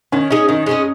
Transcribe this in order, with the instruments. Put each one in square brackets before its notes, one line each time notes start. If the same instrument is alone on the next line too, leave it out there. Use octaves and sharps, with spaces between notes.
[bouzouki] D#3 [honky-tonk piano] C#4
[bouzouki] G#3 C#4 G#4 [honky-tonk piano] D#4
[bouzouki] D#3 [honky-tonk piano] D#4
[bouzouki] G#3 C#4 G#4